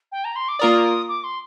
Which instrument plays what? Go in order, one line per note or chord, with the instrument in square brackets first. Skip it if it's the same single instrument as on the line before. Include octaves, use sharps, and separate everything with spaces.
[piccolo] G5
A#5
C6
D6
[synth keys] A#3 F4 A#4 D5 [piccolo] D#6
[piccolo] D6
C6